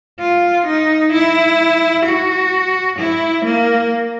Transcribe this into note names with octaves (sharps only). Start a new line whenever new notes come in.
F4
D#4
E4
F#4
E4
A#3